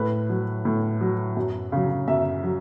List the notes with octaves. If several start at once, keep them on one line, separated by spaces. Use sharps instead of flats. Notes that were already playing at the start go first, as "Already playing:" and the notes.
Already playing: A2 B4
F#3
A2
F#3
F#2
C#3 F#3
F#2 E5
F#3